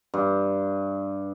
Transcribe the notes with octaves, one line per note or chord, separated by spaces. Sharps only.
G2